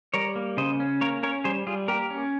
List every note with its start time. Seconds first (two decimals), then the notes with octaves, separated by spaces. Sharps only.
0.14 G3 A#4 C#5
0.36 A#3
0.57 C#3 C5 D#5
0.80 C#4
1.01 A#3 A#4 C#5
1.23 C#4 A#4 C#5
1.44 G3 G#4 C5
1.67 G3 F4 G#4
1.88 A#3 G4 A#4
2.10 C#4